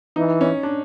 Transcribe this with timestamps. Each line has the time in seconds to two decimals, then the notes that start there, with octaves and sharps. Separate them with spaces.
0.16 E3 D#4
0.41 C#4
0.63 D4